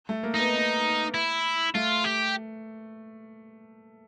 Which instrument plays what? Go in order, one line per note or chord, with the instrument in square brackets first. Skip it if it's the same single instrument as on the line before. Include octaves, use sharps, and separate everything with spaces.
[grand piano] A3
A#3
[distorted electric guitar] D#4
[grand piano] B3
B3
[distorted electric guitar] E4
[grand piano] A3 [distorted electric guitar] F4
[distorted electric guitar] G4